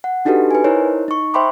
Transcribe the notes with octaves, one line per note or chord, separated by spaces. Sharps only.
F#5
D4 D#4 F#4 G4 A4 B4
B4 G#5
D#4 E4 A#4 C5 C#5
D#4 C#6
C5 E5 G5 B5 C6 D6